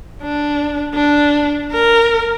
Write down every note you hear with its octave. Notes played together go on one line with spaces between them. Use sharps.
D4
D4
A#4